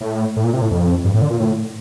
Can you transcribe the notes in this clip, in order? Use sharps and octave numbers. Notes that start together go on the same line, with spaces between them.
A2
A2
A#2
C3
A2
F2
G2
A2
D3
A#2
A2